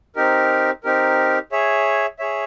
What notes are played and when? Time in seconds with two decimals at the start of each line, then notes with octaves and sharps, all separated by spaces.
0.16 C4 D#4 G4 A#4
0.84 C4 D#4 G4 A#4
1.52 G#4 C#5 E5
2.19 G#4 C#5 E5